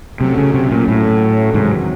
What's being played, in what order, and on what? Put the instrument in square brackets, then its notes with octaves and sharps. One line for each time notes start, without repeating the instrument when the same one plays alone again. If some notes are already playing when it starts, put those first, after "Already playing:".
[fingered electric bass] C3 [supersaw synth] F#3 A3 C#4
[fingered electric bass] C#3
C3
A#2
A2
[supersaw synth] E2 C3 D#3 F#3 [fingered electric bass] G#2